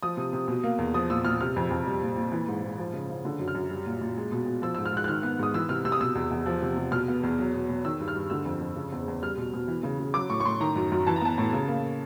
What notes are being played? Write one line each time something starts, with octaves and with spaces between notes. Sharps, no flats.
F3 D#6
C3
C3
B2
A#3
E2
F3 D#6
A#2 E6
A#2 F6
C3 F6
F2
F2
G3
A#2
A#2
E3
G#2
G#2
F3
C#3
C#3
D3
F#2
F6
F#2
G3
A#2
A#2
G#3
B2
B2
F3 E6
G#2 E6
F6
G#2 F#6
F#6
D#3 F6
B3
G#2 D#6
E3 E6
C3 F6
C3 E6
D#6
B2 E6
E2
E2
F3
C3
C3
B2 F6
B3
E2
F#3
B2
B2
D#3 E6
G2
F6
G2
D3 E6
F2
F2
C#3
E2
E2
G3 F6
B2
B2
E3
C#3
C#3
F#3 D6
A2 C#6
C#6
A2 C6
D#3 A#5
F#2
F#2
E3 A5
A#5
B3 A5
A2
C#3
A#3